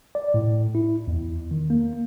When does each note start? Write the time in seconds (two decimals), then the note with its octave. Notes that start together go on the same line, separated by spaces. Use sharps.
0.15 D5
0.34 A2
0.75 E4
1.08 E2
1.51 D#3
1.70 A#3